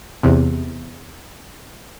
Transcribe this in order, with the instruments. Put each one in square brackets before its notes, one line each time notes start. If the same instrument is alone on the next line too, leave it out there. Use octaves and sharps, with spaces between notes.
[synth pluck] E2 C3